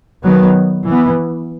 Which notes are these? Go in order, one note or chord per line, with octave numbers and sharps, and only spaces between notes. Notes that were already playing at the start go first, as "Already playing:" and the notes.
D#3 F#3 B3
E3 B3